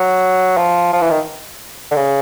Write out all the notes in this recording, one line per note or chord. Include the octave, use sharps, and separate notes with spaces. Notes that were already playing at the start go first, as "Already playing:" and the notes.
Already playing: F#3
F3
F3
E3
D#3
D3
C#3